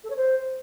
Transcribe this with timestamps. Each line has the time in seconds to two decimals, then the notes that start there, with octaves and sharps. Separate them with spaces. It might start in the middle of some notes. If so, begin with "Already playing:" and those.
0.03 A4
0.10 C#5
0.16 C5